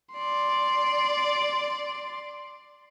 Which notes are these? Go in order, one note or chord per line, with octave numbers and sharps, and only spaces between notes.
D5 C6